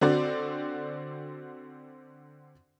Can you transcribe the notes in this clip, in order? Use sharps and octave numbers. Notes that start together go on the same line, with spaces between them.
D3 C4 F#4 D5